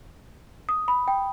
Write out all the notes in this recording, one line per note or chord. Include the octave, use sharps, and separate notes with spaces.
D#6
B5
G5